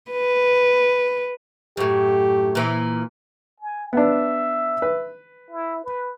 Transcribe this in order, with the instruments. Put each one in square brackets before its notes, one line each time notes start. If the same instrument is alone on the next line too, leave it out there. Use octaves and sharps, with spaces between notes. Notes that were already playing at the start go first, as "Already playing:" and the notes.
[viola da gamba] B4
[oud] F#2 A2 [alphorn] G4
[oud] A#2 E3
[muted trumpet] G#5
[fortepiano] B3 D4 [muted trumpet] E5
[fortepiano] B4
[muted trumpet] E4
B4